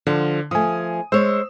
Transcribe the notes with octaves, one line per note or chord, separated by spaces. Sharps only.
D3 F3
F3 A3 G#5 D#6
G#3 C5 C#5 E6